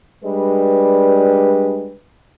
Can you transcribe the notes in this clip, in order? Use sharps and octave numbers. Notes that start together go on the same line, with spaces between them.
G3 G#3 D4 B4